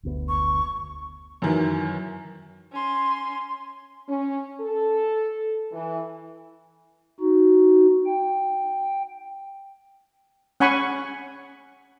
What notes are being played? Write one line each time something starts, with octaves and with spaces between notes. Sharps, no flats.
F#1 D2 B3
C#6
F#2 D#3 E3
C#4 C6
C#4
A4
E3
D#4 F#4
G5
C#4 F#5 G#5 B5 C#6